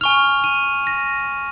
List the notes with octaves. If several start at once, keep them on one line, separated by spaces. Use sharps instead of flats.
G#5 C#6 F6 F7
D#7
A#6